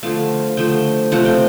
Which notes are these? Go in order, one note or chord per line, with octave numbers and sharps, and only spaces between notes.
D3 F3 A3 F5
D3 F3 A3 G5
C3 F3 A3 F#5
G5